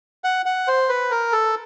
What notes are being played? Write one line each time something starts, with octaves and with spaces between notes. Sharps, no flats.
F#5
F#5
C5
B4
A#4
A4